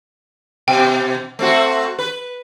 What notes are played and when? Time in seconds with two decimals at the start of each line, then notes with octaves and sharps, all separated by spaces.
0.68 B2 G5
1.39 A3 C4 F#4
1.99 B4